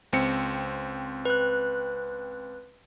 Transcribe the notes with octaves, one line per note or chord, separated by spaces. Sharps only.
C#2 C4 C#7
B4 F#6